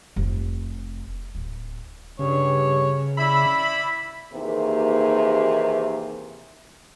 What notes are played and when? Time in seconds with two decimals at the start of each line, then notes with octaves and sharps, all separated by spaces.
0.16 F1
1.35 D1
2.19 G2 C#3 C#5
3.18 E4 D5 E5 B5
4.33 D#2 C3 E3 A#3 D#4 G#4